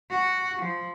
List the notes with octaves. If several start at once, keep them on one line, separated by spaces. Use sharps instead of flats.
F#4
F3